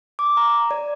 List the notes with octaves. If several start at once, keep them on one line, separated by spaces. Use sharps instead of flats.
D6
A#5
D5